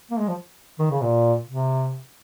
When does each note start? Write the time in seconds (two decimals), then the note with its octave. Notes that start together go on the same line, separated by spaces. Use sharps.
0.11 A#3
0.19 G#3
0.28 F3
0.79 D#3
0.91 C#3
1.02 A#2
1.48 C3